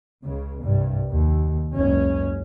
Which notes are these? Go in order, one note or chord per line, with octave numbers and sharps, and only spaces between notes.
C#2 C#3
C2 G2
D#2
F#1 C#2 C#4